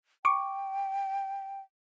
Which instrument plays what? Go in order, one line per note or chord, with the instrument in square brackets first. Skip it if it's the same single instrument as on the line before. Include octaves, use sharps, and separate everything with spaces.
[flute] G5 [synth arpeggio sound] C#6 D6